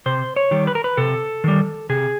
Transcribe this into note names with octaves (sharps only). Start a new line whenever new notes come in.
C3 C5
C#5
D#3 G3
B4
A#4
B4
C3 A4
D#3 G3
C3 G#4